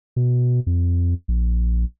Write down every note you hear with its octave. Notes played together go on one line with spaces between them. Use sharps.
B2
F2
A#1